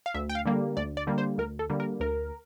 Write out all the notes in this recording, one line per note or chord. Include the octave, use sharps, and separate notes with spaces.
F5
D2 E5
G5
F5
D3 G3 A#3
D2 D5
D5
D3 G3 A#3
C5
D2 A#4
A4
D3 G3 A#3
A#4
D2 A#4